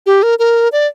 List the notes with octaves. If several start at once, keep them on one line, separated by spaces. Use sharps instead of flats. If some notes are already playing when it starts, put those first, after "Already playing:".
G4
A#4
A#4
D5